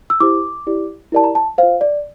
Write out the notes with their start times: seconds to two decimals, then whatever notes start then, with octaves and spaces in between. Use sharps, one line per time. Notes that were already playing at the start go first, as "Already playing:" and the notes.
0.10 E6
0.20 E4 G4 C5 D6
0.67 E4 G4 D5
1.12 E4 G4 A#4 D5 A5
1.24 A#5
1.35 A5
1.58 F4 C5 F5
1.81 D5